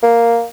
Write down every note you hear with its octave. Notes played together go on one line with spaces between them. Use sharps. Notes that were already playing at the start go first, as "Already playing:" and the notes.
A#3